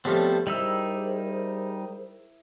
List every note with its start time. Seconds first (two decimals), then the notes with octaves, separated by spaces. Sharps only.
0.05 F3 G3 A3 B3 C4 G#4 C#5 C6
0.47 G3 D#4 E4 G#4 A#4 C5 E6